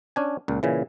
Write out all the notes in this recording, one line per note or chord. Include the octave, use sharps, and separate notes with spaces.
C#4 D4 G#5
C#2 A#2
A#2 C#3 E3